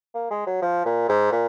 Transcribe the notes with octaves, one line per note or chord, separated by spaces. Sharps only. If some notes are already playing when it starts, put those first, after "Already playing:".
A#3
G#3
F#3
F3
A#2
G#2
A#2